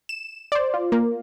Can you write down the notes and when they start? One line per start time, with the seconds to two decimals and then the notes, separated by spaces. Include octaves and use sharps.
0.09 E7
0.52 C5 D5
0.74 F4
0.92 A#3